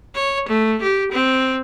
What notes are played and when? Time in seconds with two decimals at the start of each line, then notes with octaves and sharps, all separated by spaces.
0.15 C#5
0.48 A3
0.82 G4
1.12 C4